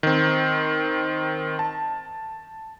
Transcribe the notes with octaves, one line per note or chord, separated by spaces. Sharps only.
D#3 C4
A5